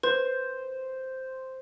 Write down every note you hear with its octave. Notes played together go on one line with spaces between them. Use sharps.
B4 C5